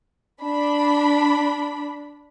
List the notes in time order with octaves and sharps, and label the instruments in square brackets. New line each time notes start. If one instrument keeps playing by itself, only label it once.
[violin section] D4 B5